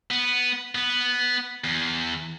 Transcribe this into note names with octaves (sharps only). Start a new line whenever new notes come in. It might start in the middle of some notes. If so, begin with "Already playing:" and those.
B3
B3
E2